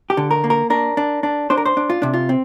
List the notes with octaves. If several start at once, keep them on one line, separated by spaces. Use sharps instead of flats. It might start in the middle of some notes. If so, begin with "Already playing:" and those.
G4
D3
A#4
A#3
A#4
D4 A#4
D4
D4
D4 C5
A#4
C5
D4
F4
C3 D4
F4
C4